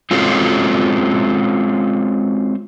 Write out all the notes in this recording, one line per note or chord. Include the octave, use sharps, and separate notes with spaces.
G#3 C4 C#4 F4 F#4 A4